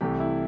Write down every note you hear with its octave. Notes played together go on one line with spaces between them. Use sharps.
C2 C3 E3 A3 G4
E4